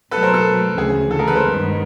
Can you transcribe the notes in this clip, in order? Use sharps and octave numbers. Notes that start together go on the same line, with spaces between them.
B2 F#3 A3 A4 B4
A#4 C5
A4
D2 C#3 E3 G#4
A4
G#4 A#4
A4 B4
A#4 C5
G2 D#3 G#3 B3